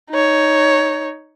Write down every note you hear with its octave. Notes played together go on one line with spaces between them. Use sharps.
D#4 C#5